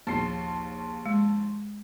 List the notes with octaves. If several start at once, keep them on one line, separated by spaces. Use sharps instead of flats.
A#1 D#2 A5 C6 C7
G#3